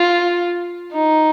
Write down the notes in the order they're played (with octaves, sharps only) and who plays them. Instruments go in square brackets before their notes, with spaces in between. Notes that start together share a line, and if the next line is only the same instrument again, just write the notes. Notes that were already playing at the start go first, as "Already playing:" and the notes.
Already playing: [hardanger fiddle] F4
D#4